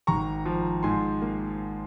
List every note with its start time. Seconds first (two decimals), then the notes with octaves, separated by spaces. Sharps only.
0.07 G#1 A#5 C#6
0.45 F3
0.83 G#2 G#5 C6
1.21 A#3